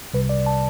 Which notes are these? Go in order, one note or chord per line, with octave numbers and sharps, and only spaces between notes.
C2 C3 G3 B4
D5
A5